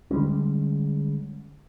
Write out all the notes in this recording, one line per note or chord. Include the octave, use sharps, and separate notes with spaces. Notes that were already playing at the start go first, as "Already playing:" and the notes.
D3 G3 G#3 C#4